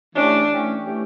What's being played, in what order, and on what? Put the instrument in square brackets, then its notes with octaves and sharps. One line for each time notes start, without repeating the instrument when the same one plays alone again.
[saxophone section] E3 A3 C#4 G4 [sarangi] D4
[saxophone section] E3 A3 C#4 G4
E3 A3 C#4 G4